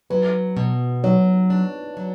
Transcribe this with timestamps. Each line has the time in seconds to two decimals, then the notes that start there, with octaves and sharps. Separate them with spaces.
0.10 F#3 B4
0.57 B2
1.04 F#3 C#5
1.50 D4
1.97 F#3